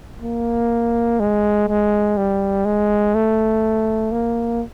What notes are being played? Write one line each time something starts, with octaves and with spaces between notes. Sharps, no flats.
A#3
G#3
G#3
G3
G#3
A3
A#3